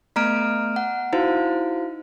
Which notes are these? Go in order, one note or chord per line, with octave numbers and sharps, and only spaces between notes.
A3 B3 A#5 F6 D7
F#5
D#4 E4 F#4 C5 F5